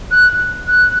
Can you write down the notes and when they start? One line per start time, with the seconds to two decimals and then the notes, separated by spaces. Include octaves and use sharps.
0.11 F#6
0.67 F#6